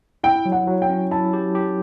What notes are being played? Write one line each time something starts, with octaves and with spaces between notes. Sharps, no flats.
E4 G5
F#3
F#5
F#3
G5
C#4
E4 A5
G4
G4